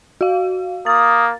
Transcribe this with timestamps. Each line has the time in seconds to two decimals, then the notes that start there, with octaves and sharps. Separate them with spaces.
0.21 F#4 F5
0.86 A#3 D#6 A6